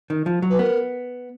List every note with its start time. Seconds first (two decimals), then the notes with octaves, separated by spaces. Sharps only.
0.10 D#3
0.26 F3
0.42 F#3
0.50 B4
0.59 B3 A#4